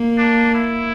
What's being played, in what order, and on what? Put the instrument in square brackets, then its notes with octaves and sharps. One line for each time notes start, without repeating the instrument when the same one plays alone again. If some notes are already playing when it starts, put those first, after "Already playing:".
Already playing: [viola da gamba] A#3
[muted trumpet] D4
E4